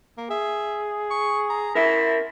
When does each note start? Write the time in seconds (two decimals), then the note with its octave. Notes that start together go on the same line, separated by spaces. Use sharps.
0.17 A#3
0.30 G#4 E5
1.10 C#6
1.50 A#5
1.75 E4 A#4 E5